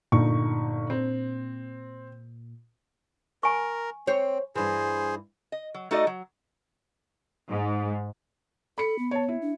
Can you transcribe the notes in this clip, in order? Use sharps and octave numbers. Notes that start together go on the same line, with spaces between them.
G1 A#2 D#4 C#6
C4
A#4 G#5 C#6
C4 C5 C#5
G2 E3 G#4 C5
D#5
F#3
A3 D#4 F#4 A4 D5 D#5
F#3
G#2
A4 B5 C#7
B3
C#5 A5
E4
D4